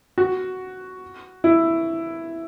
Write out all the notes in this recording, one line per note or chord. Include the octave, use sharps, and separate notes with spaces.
F#4
E4